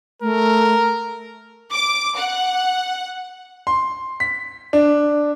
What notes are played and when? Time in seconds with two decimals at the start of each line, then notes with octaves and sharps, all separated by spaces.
0.22 A3 A#4
1.72 D6
2.16 F#5
3.67 C6
4.20 B6
4.73 D4